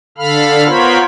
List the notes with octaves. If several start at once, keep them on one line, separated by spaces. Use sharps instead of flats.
D3 A4 F5 B5 F6
B3 F4 A#4 C5 C#5 B5